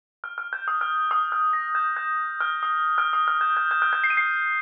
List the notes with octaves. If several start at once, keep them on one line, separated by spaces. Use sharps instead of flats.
F6
F6
G6
D#6
F6
D#6
F6
A#6
G6
G6
F6
D#6
F6
D#6
F6
G6
G6
G6
F6
G6
C7
D#7
C7